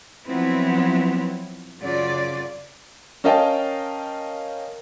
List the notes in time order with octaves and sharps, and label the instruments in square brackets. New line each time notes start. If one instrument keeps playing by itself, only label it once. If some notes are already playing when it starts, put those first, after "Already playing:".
[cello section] F3 F#3 B3 C4 E4
F#2 C#3 F#3 F4 D5
[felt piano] C#4 A#4 D#5 F5 G5 A5